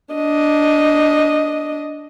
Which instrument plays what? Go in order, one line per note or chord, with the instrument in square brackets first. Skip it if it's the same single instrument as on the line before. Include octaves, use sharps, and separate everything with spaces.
[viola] D4 D#5